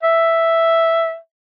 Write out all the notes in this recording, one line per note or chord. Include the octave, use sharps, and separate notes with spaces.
E5